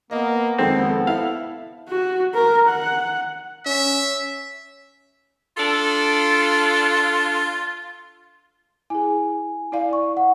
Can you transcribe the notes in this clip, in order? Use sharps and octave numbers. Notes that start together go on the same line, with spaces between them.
A#3 B3 D#5
F2 D#3 G#3 C4 A4
E4 F5
F#4
A#4
F#5
C#4 E5
D4 F4 A4
E4 G#4 G#5
E4 D5 F5
C#6
F#5